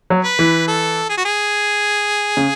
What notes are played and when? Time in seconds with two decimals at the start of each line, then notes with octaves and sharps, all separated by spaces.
0.10 F#3
0.25 B4
0.39 E3
0.68 A4
1.09 G#4
1.17 F#4
1.25 G#4
2.37 C#3